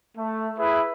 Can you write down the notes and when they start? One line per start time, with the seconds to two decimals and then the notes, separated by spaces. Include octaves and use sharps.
0.17 A3
0.59 E4 G#4 B4 E5